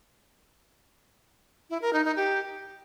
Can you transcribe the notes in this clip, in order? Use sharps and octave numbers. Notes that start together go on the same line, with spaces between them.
E4
A#4
D#4
D#4
G4